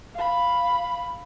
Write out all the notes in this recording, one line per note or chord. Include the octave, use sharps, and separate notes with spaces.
F5 B5